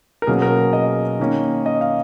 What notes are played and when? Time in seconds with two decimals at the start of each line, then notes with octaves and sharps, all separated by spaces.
0.22 A#4
0.27 B2 F#3 A#3 C#4 G#4
0.42 A#4
0.58 G#4
0.73 D#5
1.19 D#3 A#3 C#4
1.66 D#5
1.81 F5